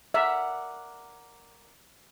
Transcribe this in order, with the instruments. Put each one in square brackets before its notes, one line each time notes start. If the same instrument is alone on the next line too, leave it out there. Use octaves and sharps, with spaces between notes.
[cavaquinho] A#4 D5 F#5 [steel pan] E5